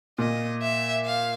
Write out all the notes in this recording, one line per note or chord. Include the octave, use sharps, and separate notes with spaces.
A#2 D#5
E5
F5